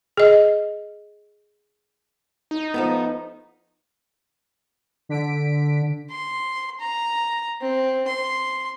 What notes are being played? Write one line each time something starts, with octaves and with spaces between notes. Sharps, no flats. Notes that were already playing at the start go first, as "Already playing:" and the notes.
G#4 D#5
D#4
F3 A3 B3
D3 B6 D7
C6
A#5
C4
C6